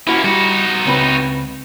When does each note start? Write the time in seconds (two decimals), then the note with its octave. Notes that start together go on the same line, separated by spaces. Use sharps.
0.07 A#3 C#4 E4 F#4
0.24 G3 D#4 F#4
0.85 C#2 C4 B4